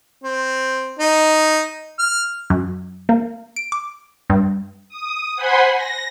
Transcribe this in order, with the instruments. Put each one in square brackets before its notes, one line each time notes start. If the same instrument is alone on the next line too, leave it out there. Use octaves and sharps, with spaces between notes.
[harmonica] C4
D#4
F6
[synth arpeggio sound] F#2
A#3
D7
D6
G2
[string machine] D#6
C5 F#5 G#5 B5 C6
A#6